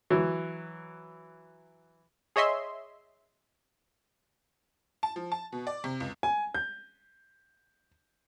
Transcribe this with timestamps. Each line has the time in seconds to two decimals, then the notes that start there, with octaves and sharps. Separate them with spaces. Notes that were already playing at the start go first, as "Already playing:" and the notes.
0.10 E3 F#3
2.36 G#4 C#5 D#5 E5 C6
5.03 A5
5.16 F3
5.32 A5
5.52 B2
5.67 D5
5.84 C3
6.00 C#2
6.23 G#5
6.54 G6